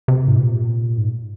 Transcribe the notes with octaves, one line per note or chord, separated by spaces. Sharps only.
C3
G#2
A#2
G#2